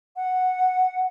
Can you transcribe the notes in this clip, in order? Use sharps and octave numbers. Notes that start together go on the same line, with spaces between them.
F#5